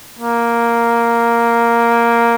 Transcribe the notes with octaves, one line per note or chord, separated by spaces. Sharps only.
A#3